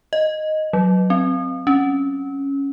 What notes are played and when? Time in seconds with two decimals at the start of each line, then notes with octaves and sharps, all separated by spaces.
0.13 D#5
0.73 F#3
1.10 C4
1.67 C#4